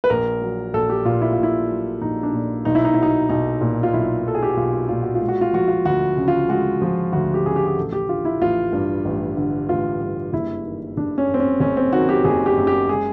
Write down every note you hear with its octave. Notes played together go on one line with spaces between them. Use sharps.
B4
A#1 A#4
F#3
A#1 A4
G4
A#2 F4
E4
F4
A#1
E4
F#3
A#1 D#4
D4
A#2
B1 D#4
E4
D#4
F#3 E4
D#4
B1 D#4
A#2
F4
B1 E4
F#3 A4
G#4
G4
F#4
B1 F4
A#2 F4
F#4
F4
G#3
F#4
F4
F3 F#4
F4
D2 F#4
C#3
F4
G#3 F#4
F3
D2 F#4
G4
C#3 G#4
G4
G#4
A1 A4
G4
D3 F4
E4
A1 F4
G2
A1
D3
A1 F4
G2
F#1 E4
D#3
F#1 D4
C#4
F#2
C4
C#4
F#1 C#4
C4
D#3 F#4
G4
F#1 G#4
G4
F#2
G4
G#3 G#4